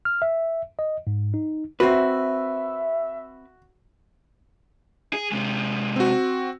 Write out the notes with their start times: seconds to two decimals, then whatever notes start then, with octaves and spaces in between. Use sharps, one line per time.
0.05 F6
0.22 E5
0.79 D#5
1.07 G#2
1.34 D#4
1.80 C4 F#4 B4 E5
5.13 G#4
5.32 C3 G#3
5.96 C4 F#4